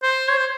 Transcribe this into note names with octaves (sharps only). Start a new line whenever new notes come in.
C5
C#5
C5